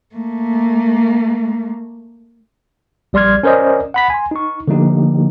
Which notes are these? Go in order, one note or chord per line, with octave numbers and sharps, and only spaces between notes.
A3 A#3
A#1 G3 D5 C6 F6 G#6
C#4 A#4 C5 D5 D#5
F#5 B5 B6
G#5 C6
D#4 C#6
D3 F3 A3 A#3 D#4 G4